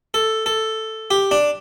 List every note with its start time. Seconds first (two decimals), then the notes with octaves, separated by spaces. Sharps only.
0.14 A4
0.46 A4
1.11 G4
1.31 D4